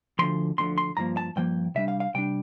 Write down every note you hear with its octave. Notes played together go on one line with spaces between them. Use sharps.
D2 D3 F3 C6
D2 D3 F3 C6
C6
G2 F3 A#3 A#5
A5
G2 F3 A#3 G5
C3 G3 D4 E5
F5
F5
C3 G3 D4 G5